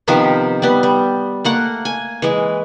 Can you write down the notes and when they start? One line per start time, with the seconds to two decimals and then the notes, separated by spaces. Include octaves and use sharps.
0.08 C3 D#3 F3 B3
0.62 G3 B3
0.83 G3
1.45 A3 A#3 F#5
1.85 G#5
2.22 E3 G#3